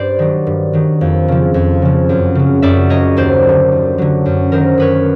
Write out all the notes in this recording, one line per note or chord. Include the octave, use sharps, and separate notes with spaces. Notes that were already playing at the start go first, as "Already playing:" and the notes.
Already playing: G2 C5 D5
D#3 F#3
G2
D#3 F#3
F2
C#3 F3
F2
C#3 F3
F#2
C#3 F#3
F#2 D5 E5
C#3 F#3 C#5 D#5
D#2 C5 D5
F#3
D3
D#2
D3 F#3
F#2
D#3 F#3 A#4 C5
F#2 B4 C#5